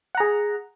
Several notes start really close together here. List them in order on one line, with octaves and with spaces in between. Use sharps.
F#5 A#5 G#4